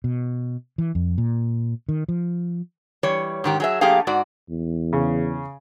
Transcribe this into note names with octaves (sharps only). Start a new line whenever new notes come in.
B2
E3
F2
A#2
D#3
F3
E3 G3 C#5
G#2 D#3 G4
F#3 G#4 E5
F3 A3 A#3 G4 G#4 F5
G#2 F#4 D5
E2
C#3